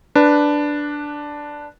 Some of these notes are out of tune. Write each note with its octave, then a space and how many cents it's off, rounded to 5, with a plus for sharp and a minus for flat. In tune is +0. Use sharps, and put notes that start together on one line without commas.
D4 +0 B4 +0